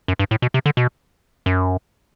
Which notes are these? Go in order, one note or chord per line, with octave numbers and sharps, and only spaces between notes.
F#2
G2
A2
B2
C3
D3
B2
F#2